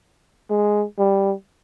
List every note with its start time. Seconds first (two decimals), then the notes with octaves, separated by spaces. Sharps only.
0.50 G#3
0.99 G3